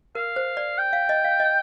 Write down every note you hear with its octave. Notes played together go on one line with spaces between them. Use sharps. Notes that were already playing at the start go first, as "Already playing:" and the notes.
A#4 F5
C5
D5
G5
F5
D#5
F5
D#5